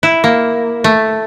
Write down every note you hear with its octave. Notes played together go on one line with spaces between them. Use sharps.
E4
A#3
A3